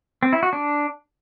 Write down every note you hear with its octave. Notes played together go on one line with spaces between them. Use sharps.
C4
E4
F#4
D4